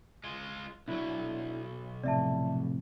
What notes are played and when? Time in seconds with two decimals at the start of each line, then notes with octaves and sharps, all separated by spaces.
0.24 G#3 F4
0.88 B1 F#3 D4 E4
2.03 F2 A2 C3 D5 E5 A5